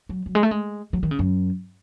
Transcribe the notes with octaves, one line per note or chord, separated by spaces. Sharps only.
F#3
F#3
G#3
A3
G#3
F#3
D#3
C#3
F#2